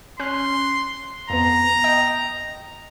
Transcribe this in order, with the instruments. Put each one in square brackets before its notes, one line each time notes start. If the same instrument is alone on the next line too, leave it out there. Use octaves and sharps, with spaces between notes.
[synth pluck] C#4 F#6 [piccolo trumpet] C6
[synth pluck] F2 B3 [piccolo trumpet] A#5
[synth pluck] D#5 G5